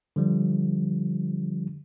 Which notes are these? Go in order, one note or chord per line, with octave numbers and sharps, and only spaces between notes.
D3 F3 G3